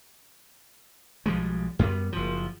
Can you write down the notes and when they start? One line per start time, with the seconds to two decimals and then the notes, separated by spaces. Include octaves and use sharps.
1.26 B1 F3 G3 G#3
1.79 F#2 G3 B3
2.13 F#1 F3